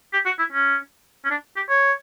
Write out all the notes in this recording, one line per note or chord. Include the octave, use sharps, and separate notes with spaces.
G4
F#4
E4
C#4
C#4
D4
G4
C#5